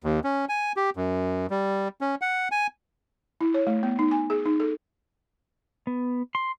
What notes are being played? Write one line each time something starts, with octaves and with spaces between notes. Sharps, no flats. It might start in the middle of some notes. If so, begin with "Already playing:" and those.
D#2
C#4
G#5
G4
F#2
G3
C#4
F#5
G#5
E4
C#5
A3
B3
D#4
G#5
G#4
D#4
A4
B3
C6